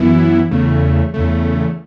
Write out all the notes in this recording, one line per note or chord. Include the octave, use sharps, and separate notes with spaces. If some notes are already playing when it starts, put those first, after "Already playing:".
Already playing: F#2 E3 B3 E4
E2 C#3 A3
E2 C#3 A3